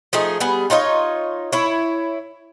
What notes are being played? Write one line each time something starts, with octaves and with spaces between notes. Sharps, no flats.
F3 A3 D#4 G#4
G3 B3 G#4
D#4 F4 C#5 D#5
E4 C#5